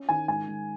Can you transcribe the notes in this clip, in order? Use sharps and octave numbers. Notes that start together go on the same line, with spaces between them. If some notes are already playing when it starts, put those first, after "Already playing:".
Already playing: C#4
D#3 G#5
G#2 G#5
G#2